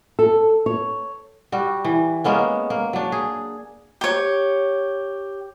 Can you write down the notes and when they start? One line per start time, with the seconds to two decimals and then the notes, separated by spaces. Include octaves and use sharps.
0.19 A4
0.66 C#5
1.52 G3 F#4
1.85 E3
2.24 G#3 A#3 B3 C#4
2.70 A#3
2.93 F#3 D4
3.12 G#4
4.01 G4 C#5